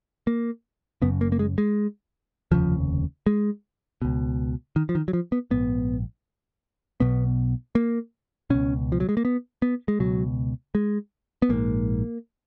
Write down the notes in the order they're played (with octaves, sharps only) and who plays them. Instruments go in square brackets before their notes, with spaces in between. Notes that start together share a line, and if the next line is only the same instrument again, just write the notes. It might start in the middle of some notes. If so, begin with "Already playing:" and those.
[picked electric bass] A#3
F#1 F#2 C#3 B3
A#3
A#3
G#3
G#3
F1 D#2 C#3 F3
G#3
C#2 B2
D#3
F3
D#3
F#3
F3
B3
A#1 G#2 B3
B1 B2 B3
A#3
C#2 B2 C#4
F3
F#3
G#3
A#3
B3
B3
G#3
C#2 B2 F#3
G#3
B3
A#1 G#2 A#3